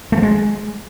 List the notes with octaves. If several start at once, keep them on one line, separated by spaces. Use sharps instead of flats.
A3
F3
G#3